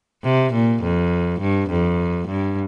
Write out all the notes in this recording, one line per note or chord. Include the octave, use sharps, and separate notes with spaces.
C3
A#2
F2
G2
F2
G2